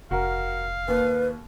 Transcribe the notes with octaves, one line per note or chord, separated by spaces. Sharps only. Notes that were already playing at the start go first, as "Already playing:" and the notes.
F1 F#4 A#4 F5
D#2 B4